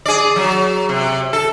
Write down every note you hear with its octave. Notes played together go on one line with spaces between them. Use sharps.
G#4 D5
F#3
C3
A4